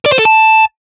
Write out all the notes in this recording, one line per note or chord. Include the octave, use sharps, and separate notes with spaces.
D5
C5
A4
A5